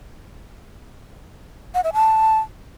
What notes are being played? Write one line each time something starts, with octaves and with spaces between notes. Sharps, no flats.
F#5
E5
A5